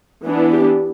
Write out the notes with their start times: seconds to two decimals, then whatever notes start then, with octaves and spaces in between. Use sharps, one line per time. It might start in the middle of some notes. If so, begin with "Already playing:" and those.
0.25 E3 B3 D4
0.52 G4